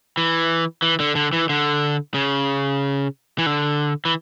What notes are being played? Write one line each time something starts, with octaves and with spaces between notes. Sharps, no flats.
E3
E3
D3
D3
E3
D3
C#3
E3
D3
E3